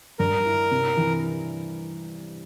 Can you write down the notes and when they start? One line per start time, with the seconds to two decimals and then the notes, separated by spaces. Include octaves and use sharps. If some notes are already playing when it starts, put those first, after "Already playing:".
0.19 G2 A#4
0.45 E4
0.71 C3
0.97 E3